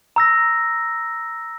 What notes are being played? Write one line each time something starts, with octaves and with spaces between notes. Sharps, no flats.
A#5 E6 A#6